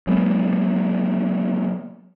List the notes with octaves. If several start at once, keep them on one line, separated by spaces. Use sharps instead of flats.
F#3 G#3 A#3 B3